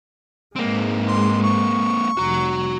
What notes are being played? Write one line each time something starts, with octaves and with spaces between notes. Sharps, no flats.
G#2 G#3 A#3 C4
C6
C#6
F1 F#4 A#5